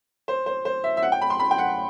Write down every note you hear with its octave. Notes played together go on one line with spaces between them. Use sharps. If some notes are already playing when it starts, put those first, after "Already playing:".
C5
C5
C5
E5
E5
F#5
G5
B5
C6
B5
G5
F#5